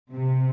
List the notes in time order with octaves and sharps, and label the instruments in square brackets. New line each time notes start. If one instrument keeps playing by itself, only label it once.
[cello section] C3